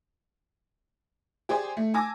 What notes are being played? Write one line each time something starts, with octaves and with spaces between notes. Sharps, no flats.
G4 G#4 C5 D5
A3
G#5 A5 D6 E6 A#6